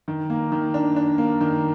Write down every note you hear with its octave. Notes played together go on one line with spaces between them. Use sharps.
D#3
A#3
D#3
D4
D4
A#3
D#3